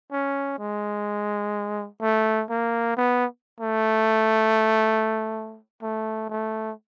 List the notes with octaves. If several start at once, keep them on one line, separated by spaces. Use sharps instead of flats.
C#4
G#3
A3
A#3
B3
A3
A3
A3